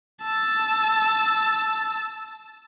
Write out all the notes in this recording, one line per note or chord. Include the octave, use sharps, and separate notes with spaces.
A5 E6